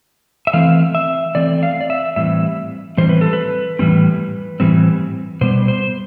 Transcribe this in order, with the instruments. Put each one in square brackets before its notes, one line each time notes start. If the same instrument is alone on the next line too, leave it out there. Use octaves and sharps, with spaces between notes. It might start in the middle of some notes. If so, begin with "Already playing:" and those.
[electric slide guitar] E5
E3 A3 C4 F5
E5
E3 A3 C4 D5
F5
D5
E5
A2 E3 G3 C4 E5
A2 E3 G3 C4 C5
B4
A4
B4
A2 E3 G3 C4
A2 E3 G3 C4
B2 G3 B3 C5
C5